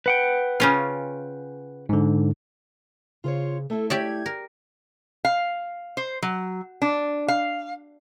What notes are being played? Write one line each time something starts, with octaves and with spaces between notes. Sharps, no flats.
B4 F#5 G5
C#3 C#4 F4
G#2 D3
C#3 F4 C5 C#5
A3 E4 A4
G4 D5 E5 G#6
A#4
F5
C5
F#3
D4
F5